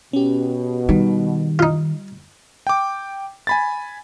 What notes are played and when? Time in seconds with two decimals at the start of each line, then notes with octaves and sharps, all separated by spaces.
0.13 B2 C#4 G4
0.89 D#3 G3
1.59 D#4 F4
2.67 G5 D6
3.47 G#5 B5 A6